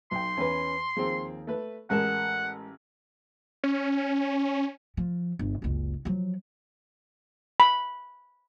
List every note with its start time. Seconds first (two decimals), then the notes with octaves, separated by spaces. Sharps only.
0.11 B1 G5 C6
0.37 E2 C#4 B4
0.97 D#2 F3 C4 G#4
1.47 A3 B4
1.90 A1 G#3 G#4 A#4 F#5 A5
3.64 C#4
4.97 F3
5.39 G1
5.62 F#1 C#2
6.05 F3 F#3
7.60 B5